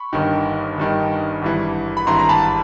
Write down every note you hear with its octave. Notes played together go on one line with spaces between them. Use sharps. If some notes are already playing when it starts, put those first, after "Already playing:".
Already playing: B5 C#6
G1 G2 D#3
G1 G2 D#3
G#1 G2 E3
B5
G#1 G2 E3 A#5 C6
A#5
A5 B5